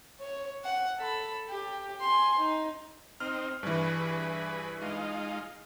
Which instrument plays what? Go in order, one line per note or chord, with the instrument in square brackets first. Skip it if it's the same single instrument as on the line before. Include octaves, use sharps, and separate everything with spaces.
[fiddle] C#5
F#5
A4 B5
G4
G#5 C6
D#4
[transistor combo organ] C4 D#4 [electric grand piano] F6
[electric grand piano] G2 E3 [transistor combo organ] G#4 B4
[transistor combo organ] G#3 D#4 F4